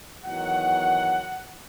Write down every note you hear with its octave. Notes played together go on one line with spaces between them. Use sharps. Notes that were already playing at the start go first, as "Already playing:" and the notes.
E2 D#3 F#3 F#5